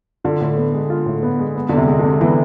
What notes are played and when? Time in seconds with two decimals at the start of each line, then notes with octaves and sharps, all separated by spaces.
0.24 D3 F4
0.41 A2
0.57 B3
0.73 G#3
0.90 F4
1.06 A2
1.23 B3
1.39 G#3
1.56 B3
1.69 E2 D3
1.77 C3
1.88 G#3
1.99 D3
2.04 C3
2.21 E3 B3